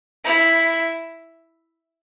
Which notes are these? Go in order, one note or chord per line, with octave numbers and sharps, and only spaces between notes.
E4